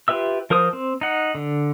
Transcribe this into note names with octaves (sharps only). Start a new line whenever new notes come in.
F4 G4 B4 E5 E6
F3 A#4 C5 D#6
C4
D#4 F#5
D3